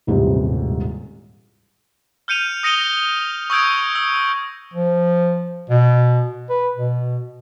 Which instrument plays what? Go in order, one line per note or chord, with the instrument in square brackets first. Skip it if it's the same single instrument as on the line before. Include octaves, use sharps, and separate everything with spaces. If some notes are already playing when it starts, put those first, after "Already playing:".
[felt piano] D#1 A1 G#2 C3 G3 G#3
[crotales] F6 G6 C#7 D#7 F7
D#6 A#6 C#7 D#7 G7
C#6 D#6 E6 G6 G#6 D7
E6
[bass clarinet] F3
B2
B4
B2